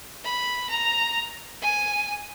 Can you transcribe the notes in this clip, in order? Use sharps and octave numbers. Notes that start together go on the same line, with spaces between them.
B5
A#5
G#5